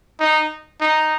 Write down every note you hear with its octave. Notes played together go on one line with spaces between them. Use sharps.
D#4
D#4